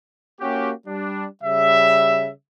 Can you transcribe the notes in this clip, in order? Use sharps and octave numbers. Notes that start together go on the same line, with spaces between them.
A#3 C#4 F#4 G4
G3 D4
C#3 G3 E5